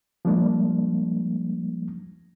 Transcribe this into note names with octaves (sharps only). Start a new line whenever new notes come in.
F3 G3 G#3 A#3 D4